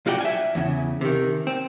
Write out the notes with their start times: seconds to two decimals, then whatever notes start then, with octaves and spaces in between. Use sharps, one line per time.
0.06 B1 F4 F#4 D5 G5
0.21 E5 G#5
0.55 E2 C#3
1.01 C3 D#3
1.47 C4